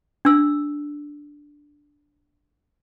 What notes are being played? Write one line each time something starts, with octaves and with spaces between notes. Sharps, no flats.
D4 E6